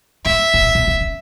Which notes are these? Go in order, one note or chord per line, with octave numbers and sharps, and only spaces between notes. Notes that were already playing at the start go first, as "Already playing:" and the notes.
G#2 E5
A2
A#2
B2
C3
C#3